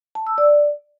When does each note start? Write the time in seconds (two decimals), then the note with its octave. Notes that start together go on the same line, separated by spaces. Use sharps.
0.15 A5
0.27 E6
0.38 D5